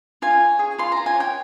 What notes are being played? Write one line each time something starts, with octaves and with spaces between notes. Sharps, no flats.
F4 G#5
C#5
G#4
F4 C6
F4 A#5
G#5
C#5 G5